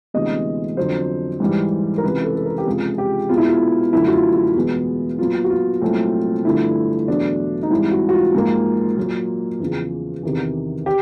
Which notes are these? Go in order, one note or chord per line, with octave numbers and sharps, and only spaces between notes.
D2 C3 E3 G#3 B3 D#5
F2 D3 F#3 C5
G#2 E3 G3
A#4
C#2 C3 E3 B4
A4
A4
A#4
G4
C#2 C3 F3 G#3 G#4
G4
B2 G#3 B3 F4
E4
F4
F#2 D3 F3 A3 E4
F#4
F4
F#4
E2 B2 G#3 B3
A#2 F#3 B3 F4
F#4
F4
C2 A#2 F#3 A3 C4
G2 D3 F3 A3 E4
E2 B2 F#3 A3 D4
D#4
G#2 E3 G3 C4 E4
F#4
F#4
F4
G#2 F3 A#3
A#2 F#3 A#3
E2 C#3 F3
E2 C3 D#3
G4